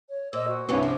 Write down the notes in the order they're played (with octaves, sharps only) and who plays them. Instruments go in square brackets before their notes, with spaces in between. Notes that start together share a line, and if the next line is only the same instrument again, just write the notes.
[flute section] C#5
[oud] A#2 [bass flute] C5 [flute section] D#5 E6
[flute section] F#4
[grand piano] C2 G2 C3 [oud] E3 B3 C#4 [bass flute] C#5
[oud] F3 [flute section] D6